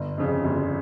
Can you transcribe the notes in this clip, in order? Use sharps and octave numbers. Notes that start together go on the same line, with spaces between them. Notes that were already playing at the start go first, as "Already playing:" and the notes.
Already playing: G1
F2 C#3
G1